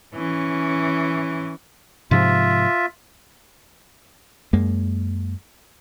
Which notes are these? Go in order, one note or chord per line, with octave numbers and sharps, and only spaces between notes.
E3 C#4
G#2 C3 F3 F4 E5
F#2 G#3 A#3